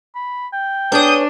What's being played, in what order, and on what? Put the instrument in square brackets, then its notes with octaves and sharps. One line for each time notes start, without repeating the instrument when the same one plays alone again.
[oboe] B5
G5
[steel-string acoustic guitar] B3 G#4 C#5 [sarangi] D4 [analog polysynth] D#6 G6